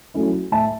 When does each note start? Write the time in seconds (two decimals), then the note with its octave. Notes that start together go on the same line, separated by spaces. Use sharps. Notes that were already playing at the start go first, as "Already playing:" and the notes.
0.14 F#3 A3 C#4 E4
0.52 A2 E5 A5